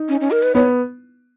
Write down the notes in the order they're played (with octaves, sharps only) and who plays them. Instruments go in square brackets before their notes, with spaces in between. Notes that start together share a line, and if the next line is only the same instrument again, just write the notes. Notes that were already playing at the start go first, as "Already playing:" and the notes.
Already playing: [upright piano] D#4
[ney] C#4
C#4
A#4
B4
[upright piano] B3 [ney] C#5